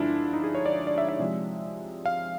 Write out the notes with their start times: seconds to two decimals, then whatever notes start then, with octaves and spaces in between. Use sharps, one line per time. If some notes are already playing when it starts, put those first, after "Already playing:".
Already playing: G2 D3 F3 G#3 D4 E4 F4
0.33 D#4
0.44 G#4
0.55 C#5
0.66 D5
0.87 D5
0.98 E5
1.09 E5
1.19 C3 F3 G#3
2.06 F5